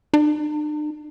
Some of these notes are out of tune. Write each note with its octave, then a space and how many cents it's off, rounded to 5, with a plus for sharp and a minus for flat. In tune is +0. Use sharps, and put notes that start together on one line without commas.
D4 +45